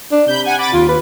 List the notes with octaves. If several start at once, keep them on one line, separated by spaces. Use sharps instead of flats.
D4
C3 B5 G6
F#5 G#5
B5 D6 A6
D#2 F4
B4